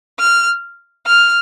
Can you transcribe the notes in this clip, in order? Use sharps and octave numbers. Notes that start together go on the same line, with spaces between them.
F6
F6